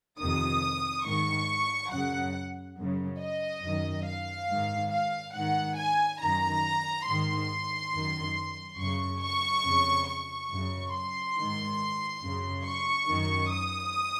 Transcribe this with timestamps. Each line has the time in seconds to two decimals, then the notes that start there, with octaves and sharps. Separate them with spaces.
0.19 F2 C3 D#3 D#6
1.05 G#2 D#3 C#6
1.92 F#2 C#3 F#5
2.77 F#2 C#3
3.20 D#5
3.63 F#2 D#3
4.06 F5
4.49 G#2 D#3
4.92 F5
5.35 G#2 D#3 F#5
5.78 G#5
6.21 F#2 D#3 A#5
7.07 G#2 D#3 C6
7.93 F#2 D#3
8.79 F#2 C#3 C#6
9.21 C#6
9.64 F2 C#3
10.08 C#6
10.51 F#2 C#3
10.93 C6
11.37 G#2 D#3
12.22 F#2 C#3
12.65 C#6
13.08 F#2 D#3
13.51 D#6